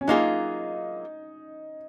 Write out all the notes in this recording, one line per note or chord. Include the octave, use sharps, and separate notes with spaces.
C#4
F#3 A#3 D#4 F4 G#4